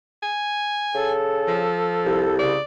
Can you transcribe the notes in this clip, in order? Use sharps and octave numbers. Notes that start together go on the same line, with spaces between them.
G#5
C#3 A4
F3
C2
C#3 D5